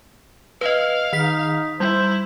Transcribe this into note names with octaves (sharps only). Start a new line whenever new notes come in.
B4 D#5 F5
D#3 D#4 B6
G3 E4 C5